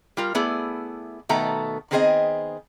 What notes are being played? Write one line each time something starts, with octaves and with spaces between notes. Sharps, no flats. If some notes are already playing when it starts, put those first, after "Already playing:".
G3 F4 A#4
A3 B3 E4 G#4 D5
B2 D#3 A3 B3 A4 A#5
D#3 B3 C4 G#4 A#4 D#5